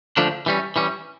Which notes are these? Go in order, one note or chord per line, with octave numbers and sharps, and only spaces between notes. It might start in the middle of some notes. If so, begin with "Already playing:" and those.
D3 F3 A3 D4
E3 G3 C#4
E3 G3 C#4